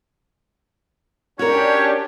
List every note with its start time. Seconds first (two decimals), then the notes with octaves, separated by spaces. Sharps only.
1.39 C#4 D4 F#4 G4 A#4 C#5